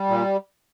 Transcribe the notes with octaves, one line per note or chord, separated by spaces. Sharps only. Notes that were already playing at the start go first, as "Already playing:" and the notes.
Already playing: G3
A#2